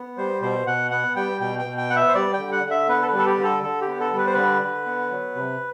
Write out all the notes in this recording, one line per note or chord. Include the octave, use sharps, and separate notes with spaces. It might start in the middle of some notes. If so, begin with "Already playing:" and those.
Already playing: B3
G3 C5
B2 C5
B2 F#5
B3 F#5
G3 G5
B2 G5
G5
B2
G5
B3 F#5
E5
C5
G3 D5
G5
D3
F#5
D3
E5
B3 B4
A4
B4
G3
A4
G4
D3
A4
D3 A4
G4
B3
A4
G3
B4
C5
D3 B4
D3
B3
F#3
C3